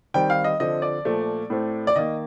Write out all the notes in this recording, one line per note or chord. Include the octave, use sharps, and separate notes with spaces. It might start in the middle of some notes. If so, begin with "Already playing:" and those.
D#3 G3 C4 G5
F5
D#5
D3 F3 C4 D#5
D5
A#2 F3 A3
A2 A3 C4
D5
D#3 A#3 D#5